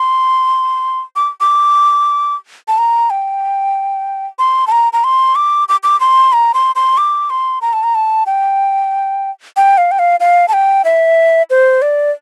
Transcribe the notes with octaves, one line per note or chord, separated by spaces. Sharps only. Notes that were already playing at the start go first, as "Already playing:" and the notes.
Already playing: C6
D6
D6
A5
A#5
G5
C6
A5
A#5
A#5
C6
D6
D6
D6
C6
A#5
C6
C6
D6
C6
A#5
A5
A#5
A5
G5
G5
F5
G5
F5
F5
A5
G5
E5
C5
D5